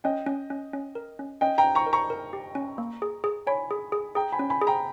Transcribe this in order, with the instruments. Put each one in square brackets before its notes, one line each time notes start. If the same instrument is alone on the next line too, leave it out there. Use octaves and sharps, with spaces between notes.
[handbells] C#4 [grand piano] D#5 G5
[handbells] C#4
C#4
C#4
A#4
C#4
[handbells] C#4 [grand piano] D#5 G5
[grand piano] G5 A#5
[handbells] C#4
[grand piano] A#5 C#6
[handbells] A#4
[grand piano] A#5 C#6
[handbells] A#4
G4
C#4
A#3
G#4
G#4
[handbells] C#5 [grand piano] G#5 B5
[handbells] G#4
G#4
[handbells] G#4 [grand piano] G5 A#5
[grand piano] G#5 B5
[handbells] C#4
[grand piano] G#5 B5
[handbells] G#4
[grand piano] G5 A#5